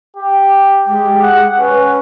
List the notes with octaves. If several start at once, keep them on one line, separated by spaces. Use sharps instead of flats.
G4
G#3 G4
F#5
C#4 B4